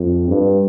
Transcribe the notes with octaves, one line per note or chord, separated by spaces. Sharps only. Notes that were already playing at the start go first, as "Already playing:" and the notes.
Already playing: F2
G2